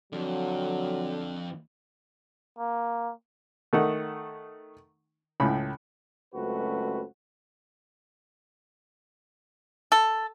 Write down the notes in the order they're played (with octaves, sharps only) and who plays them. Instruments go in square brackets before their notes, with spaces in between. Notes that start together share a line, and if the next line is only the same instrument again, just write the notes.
[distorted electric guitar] F2 [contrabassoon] D3 [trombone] F#3
[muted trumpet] A#3
[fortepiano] D#3 A3 D#4 F#5
C#2 A2 B5
[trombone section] C#2 F#2 A3 C4 F#4 B4
[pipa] A4